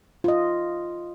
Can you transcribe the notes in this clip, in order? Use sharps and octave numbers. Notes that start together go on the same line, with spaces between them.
F4 D#5